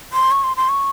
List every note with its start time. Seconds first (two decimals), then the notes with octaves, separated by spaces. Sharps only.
0.13 C6
0.31 C#6
0.44 C6
0.57 C6
0.69 C#6